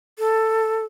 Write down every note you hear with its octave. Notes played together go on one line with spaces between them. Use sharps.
A4